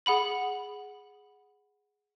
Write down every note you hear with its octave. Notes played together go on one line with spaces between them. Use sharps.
G#4 F#5 B5 F#7